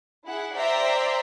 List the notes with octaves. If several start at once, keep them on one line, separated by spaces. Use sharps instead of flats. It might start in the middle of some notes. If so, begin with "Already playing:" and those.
E4 G#4 F#5
C5 D5 E5 G5 A#5 C6